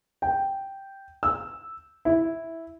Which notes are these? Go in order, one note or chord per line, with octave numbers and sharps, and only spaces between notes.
G5
E6
E4